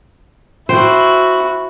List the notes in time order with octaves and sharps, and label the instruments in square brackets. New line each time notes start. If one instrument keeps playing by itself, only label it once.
[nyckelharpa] E4 F#4 [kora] C5 G5